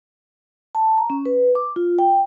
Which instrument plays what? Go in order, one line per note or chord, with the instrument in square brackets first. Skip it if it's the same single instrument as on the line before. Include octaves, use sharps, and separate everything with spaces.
[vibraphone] A5
A#5
C#4
B4
D6
F4
G5